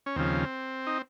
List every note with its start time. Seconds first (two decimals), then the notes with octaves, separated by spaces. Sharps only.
0.06 C#4
0.16 D#2 C#3 F3 C4
0.87 D#4